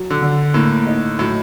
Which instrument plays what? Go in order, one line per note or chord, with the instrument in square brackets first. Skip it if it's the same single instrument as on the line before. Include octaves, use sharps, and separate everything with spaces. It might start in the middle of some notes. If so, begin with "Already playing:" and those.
Already playing: [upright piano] F#3
[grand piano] D3
[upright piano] D3
[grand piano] A2 [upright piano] A#3
[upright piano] D#4
[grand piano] A2 [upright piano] F#3